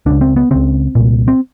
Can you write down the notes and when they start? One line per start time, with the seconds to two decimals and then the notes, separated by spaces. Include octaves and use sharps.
0.06 C#2 C#3 D4
0.21 C4
0.36 B3
0.51 C#2 C#3 C4
0.95 C2 A#2
1.28 C4